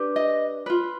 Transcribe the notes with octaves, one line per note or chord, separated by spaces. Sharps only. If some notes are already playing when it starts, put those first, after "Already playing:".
Already playing: D4 G4 B4
D#5
F4 B4